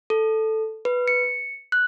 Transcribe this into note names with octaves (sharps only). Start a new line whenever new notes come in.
A4
B4
C#7
F#6